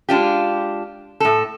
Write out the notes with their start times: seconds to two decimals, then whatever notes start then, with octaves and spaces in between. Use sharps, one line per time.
0.09 G#3 D4 F4 G4
1.20 A2 A4